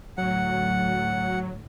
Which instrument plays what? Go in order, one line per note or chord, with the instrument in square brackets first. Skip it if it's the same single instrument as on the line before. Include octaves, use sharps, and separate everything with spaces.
[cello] D2 A2 [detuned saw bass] F#3 [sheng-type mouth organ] F#5